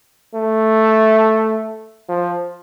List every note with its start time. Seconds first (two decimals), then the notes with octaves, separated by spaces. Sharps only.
0.35 A3
2.09 F3